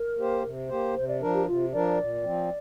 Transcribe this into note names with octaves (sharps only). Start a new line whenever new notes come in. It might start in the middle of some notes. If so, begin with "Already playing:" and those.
Already playing: A#4
A#3 G4 C5
C3
A#3 G4 C5
C3 C5
D5
F3 D4 A#4
G4
C3 F4
F3 D4 A#4 D5
A#2
F3 C4